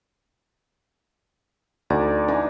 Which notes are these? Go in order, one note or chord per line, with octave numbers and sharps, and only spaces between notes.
D2 D#4 D5
E3 D4 D#4